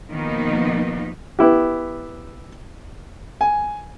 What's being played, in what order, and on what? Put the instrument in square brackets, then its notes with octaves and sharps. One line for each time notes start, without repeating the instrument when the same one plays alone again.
[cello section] B2 D#3 F3 A#3 B3 D#4
[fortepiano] B3 E4 G4
[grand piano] G#5